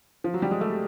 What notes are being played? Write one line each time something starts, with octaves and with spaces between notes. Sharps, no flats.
F3
F#3
G3
G#3
A3